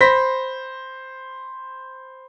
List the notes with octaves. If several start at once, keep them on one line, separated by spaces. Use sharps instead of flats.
C5 B5 A#6 B6